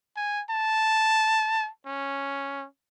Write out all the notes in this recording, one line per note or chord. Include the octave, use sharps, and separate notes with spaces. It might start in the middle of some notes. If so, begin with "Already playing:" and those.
G#5
A5
C#4